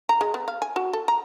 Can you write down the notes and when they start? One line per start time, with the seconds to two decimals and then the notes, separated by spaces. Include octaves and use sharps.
0.09 A#5
0.21 G#3
0.34 B3
0.48 F5
0.62 G#5
0.76 F#4
0.93 A4
1.08 A#5